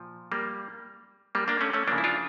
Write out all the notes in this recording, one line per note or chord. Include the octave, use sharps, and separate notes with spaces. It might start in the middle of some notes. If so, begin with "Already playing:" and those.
Already playing: A#2 F3
G3 A#3
G3 A#3
A#3 D4
A3 C#4
A3 C#4
C#3 F3 A#3 D4
E4
D4 F4